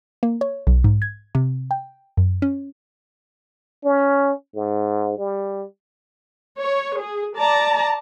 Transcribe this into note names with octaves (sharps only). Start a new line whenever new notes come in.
A#3
C#5
B1
G#2
G#6
C3
G5
F#2
C#4
C#4
G#2
G3
C#5
G#4
D5 A5 A#5